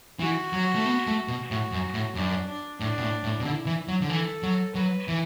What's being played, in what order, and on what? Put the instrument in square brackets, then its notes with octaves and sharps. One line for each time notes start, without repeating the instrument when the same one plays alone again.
[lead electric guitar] E3 [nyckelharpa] F#4
[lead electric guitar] F#3
A3
B3
A3
B2
[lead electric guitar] A2 [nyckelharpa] F#4
[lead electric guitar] F#2
A2
[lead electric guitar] F#2 [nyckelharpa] D4
[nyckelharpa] D4
[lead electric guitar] A2 [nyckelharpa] D4
[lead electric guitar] B2
A2
A2
B2
[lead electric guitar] D3 [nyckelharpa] E4
[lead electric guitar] E3
F#3
D3
[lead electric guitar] E3 [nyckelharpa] A4
[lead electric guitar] F#3
[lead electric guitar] F#3 [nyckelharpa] B4
[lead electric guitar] E3